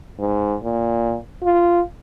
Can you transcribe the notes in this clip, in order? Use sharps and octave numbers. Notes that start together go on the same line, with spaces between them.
G#2
A#2
F4